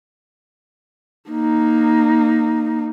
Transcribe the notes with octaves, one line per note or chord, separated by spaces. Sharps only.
A#3 D#4